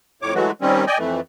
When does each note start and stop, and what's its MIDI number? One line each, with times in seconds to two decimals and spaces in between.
0.22 0.34 41
0.22 0.34 45
0.22 0.34 73
0.22 0.34 86
0.34 0.51 52
0.34 0.51 54
0.34 0.51 56
0.34 0.51 57
0.34 0.51 66
0.61 0.85 51
0.61 0.85 55
0.61 0.85 60
0.61 0.85 61
0.87 0.98 74
0.87 0.98 75
0.87 0.98 79
0.87 0.98 80
0.98 1.21 41
0.98 1.21 52
0.98 1.21 57